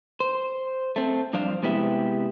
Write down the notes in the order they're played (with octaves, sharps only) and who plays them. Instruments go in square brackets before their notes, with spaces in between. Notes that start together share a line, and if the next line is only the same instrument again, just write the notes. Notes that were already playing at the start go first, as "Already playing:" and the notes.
[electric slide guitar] C5
A3 C4
G2 F3 D4 C5 F5
C3 G#3 B3 E4 G4 E5